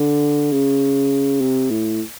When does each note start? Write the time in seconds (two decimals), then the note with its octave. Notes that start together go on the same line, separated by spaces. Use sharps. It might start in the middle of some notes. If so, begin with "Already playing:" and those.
Already playing: D3
0.52 C#3
1.41 C3
1.70 A2